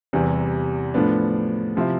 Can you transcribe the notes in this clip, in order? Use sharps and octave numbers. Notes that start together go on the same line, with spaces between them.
E2 C3 E3 G3
A2 F3 B3 D4
C3 F3 C4 E4